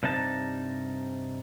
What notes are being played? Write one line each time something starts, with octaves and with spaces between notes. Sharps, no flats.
G2 C3 D#4 A5